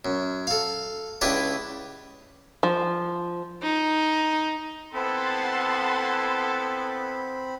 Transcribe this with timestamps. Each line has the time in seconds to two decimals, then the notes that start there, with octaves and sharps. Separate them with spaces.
0.05 F#2
0.47 A4 F5
1.21 C#2 D4 E4 G4 B4 A5
2.63 F3
3.62 D#4
4.94 B3 C4 E4 A4 F#5 A5 B5 C6